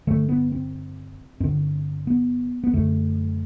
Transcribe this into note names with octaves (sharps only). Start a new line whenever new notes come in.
G2 D3 A3
B3
C4
G2 D3 C4
B3
B3
F#2 D3 A3